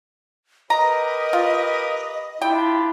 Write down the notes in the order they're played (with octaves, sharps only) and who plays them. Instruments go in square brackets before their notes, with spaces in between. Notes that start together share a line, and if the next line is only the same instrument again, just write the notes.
[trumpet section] G4 A#4 B4 [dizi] D#5 [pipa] A#5
[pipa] F4
[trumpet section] D4 F4 G4 [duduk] E4 [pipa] G5